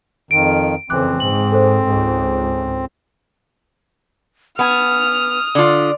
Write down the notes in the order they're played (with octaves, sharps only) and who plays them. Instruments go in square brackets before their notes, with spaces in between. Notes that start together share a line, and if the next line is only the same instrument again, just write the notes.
[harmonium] F2 D#3 [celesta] D7
[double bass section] F2 C#3 E3 [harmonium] C4 [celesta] D6 F#6
[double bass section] G#2 [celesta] F#7
[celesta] A4 C5
[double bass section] C#2 G#2
[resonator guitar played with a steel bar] B3 G#5 [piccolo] D#6 [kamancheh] F6
[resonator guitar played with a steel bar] D3 F4 [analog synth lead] D5